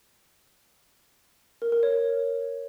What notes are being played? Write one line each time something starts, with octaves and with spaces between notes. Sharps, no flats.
A#4
A#4
C#5